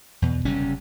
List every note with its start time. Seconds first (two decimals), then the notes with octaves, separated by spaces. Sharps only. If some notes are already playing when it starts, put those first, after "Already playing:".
0.22 E2 B2
0.45 F#1 C3 G3 C#4